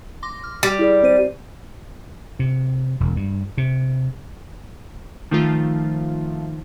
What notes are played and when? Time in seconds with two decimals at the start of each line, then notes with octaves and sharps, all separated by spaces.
0.23 C6 D6 A#6
0.44 F6
0.63 G3
0.79 E4 G#4 D5
1.03 C4 C5 D#7
2.39 C3
3.00 E1
3.16 G2
3.58 C3
5.31 D#3 F3 A3 F4